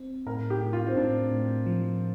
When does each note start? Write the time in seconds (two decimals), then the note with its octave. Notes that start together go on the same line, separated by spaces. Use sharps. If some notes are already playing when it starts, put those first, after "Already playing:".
Already playing: C4
0.26 A2 A#4
0.50 G4
0.61 A2
0.73 F4
0.87 C4
0.96 A2 D4
1.31 A2
1.66 F3